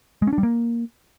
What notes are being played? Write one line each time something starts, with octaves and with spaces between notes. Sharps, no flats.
G#3
C#4
D4
G3
A#3